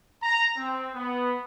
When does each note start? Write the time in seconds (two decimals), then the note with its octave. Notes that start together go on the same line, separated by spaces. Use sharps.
0.22 A#5
0.56 C4
0.94 B3